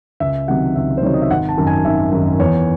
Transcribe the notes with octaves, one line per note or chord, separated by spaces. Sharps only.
C#2 E5
C3 D#3 F#3 F#5
C#2 E5
C5
C3 D#3 F#3 C#5
D#5
E5
G#1 F#5
A5
F#2 D#3
G#5
G#1 E5
F#2 D#3
E2 C#5